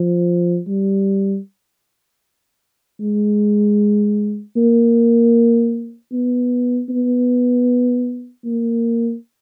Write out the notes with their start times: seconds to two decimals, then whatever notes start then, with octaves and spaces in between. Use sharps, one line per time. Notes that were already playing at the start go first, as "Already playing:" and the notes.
Already playing: F3
0.68 G3
3.01 G#3
4.56 A#3
6.12 B3
6.90 B3
8.45 A#3